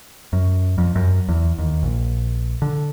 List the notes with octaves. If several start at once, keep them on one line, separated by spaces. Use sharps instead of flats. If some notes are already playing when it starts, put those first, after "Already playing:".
F#2
F2
F#2
E2
D#2
A#1
D3